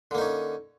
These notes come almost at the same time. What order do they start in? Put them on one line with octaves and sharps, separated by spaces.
D3 A#3 D#4 C#4